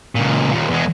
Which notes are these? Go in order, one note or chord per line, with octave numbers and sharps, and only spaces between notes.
C#2 A#2
D#2 A#2
E2 G#3